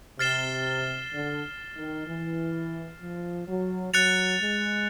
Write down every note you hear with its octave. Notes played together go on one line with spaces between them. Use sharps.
C3 F6 A6 C7 E7 G7
D3
D#3
E3
F3
F#3
F#3 F#6 A6 C#7 F7
G#3